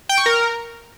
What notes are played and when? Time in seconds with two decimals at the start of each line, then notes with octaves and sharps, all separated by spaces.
0.09 G5
0.18 C#6
0.26 A#4